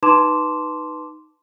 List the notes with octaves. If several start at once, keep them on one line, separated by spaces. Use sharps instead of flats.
D#4 B4 A5 C6 D6 E7